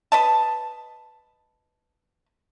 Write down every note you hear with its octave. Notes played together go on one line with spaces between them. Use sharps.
B4 D#5 A5